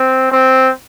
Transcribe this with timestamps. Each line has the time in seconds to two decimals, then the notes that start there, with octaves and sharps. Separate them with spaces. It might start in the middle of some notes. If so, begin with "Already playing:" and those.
Already playing: C4
0.32 C4